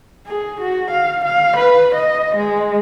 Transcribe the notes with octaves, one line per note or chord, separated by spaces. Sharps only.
G#4
F#4
F5
F5
B4
D#5
G#3